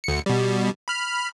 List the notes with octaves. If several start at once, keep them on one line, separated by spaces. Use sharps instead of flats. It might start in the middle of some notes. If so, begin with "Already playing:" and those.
D2 C#7
B2 G3
B5 F6